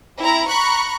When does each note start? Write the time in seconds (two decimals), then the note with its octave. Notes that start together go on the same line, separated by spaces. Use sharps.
0.19 C4 E4 A#5
0.49 A#5 B5 C#6 F#6